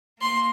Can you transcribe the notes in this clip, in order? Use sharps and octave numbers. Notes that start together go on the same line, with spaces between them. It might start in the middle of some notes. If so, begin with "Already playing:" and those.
A#3 C6